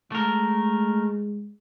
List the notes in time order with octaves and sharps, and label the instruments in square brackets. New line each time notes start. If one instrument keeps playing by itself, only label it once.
[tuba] G#3 [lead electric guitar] A3 A#4